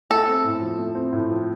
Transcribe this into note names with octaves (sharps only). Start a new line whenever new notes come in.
A3 A4
C4
A2
F3
A3
C4
A2
F3